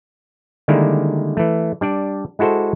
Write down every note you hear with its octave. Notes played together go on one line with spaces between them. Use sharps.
D3 D#3 G3 G#3 A#3 E4
E3 A3
G3 D4 D5
G#3 E4 F#4 A4 C5